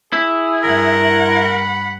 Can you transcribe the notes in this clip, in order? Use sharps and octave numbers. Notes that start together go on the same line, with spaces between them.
E4 G#4
G2 A#4 F#5
B5